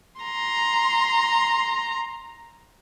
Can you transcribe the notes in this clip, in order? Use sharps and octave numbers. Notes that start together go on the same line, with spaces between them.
A#5 C6